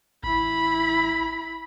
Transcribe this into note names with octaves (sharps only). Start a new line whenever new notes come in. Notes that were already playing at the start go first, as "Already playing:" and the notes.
A1 E4 B5